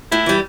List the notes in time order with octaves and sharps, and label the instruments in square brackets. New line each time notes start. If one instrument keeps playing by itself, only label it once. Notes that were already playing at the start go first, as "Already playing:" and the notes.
[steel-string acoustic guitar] A2 [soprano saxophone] E4
[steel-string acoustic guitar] E3 G3